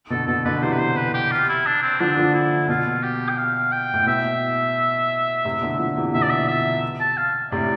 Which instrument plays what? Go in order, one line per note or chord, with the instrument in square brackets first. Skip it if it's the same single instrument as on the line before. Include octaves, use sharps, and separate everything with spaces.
[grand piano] B2 D3 [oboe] A4
[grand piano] B2 [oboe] A4
[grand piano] B2 D3 [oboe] B4
[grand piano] C3 E3 [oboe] C5
[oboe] B4
C5
B4
G4
F4
E4
D4
C4
[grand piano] D3 F3 [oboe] D4
[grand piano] D3 F3
[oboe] E4
[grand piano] B2 [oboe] F4
[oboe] G4
G5
F5
G5
[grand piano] A2
[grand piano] B2 [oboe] E5
[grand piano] A2 C3
B2 D3
D3 F3
C3 E3
[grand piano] B2 D3 [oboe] E5
[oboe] D5
E5
E5
A5
F5
[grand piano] A2 C3 [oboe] D5